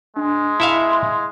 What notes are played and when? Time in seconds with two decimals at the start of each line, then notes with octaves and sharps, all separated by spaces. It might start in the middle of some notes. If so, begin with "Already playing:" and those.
0.16 G#3 D4
0.60 E4 E5 F5 A5 C#7
0.92 C6